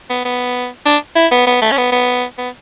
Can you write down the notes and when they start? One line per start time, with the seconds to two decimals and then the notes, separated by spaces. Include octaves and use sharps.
0.10 B3
0.25 B3
0.86 D4
1.16 E4
1.32 B3
1.47 B3
1.62 A3
1.71 C#4
1.78 B3
1.92 B3
2.38 B3